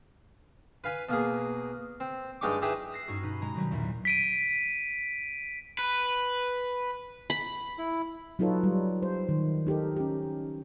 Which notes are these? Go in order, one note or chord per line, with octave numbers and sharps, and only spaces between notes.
B4 F5 G#5 B5
B2 A#3 G#4
C4
G2 G#3 D#4 G4 C#6 D6
D#4 E4 G4 G#4 B4
E6 F#6 A#6 C7
G2 C#4 D#4 F#4
B2 D#4 B4
B2 G#3 A#5
B2 D#3 F#3 G3
B1 E2 A#2
B6 D7 D#7
B4
B5
E4
F#3 D#4 F4 A4 B4 C#5
G3
C5
D#3
D#4 G4 A4 A#4
C#4 G4